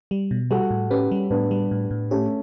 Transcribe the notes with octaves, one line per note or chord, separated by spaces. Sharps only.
G3
B2
G3 F#4 A4
A2
C#4 G4 B4
G3
A2 B3 D4
G3
A2
A2
A3 C#4 G4